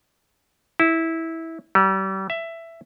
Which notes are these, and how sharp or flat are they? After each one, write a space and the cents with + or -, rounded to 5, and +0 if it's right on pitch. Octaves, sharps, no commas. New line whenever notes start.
E4 -15
G3 -35
E5 +10